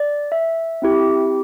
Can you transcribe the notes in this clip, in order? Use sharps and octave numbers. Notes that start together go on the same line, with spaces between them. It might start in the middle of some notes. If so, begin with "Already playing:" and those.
Already playing: D5
E5
C4 E4 G4